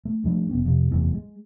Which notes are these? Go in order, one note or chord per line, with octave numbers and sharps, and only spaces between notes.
A3
G2 F3 A3
F1 B3 C#4
F2 C3
F#1 E2 A2 C3
G#3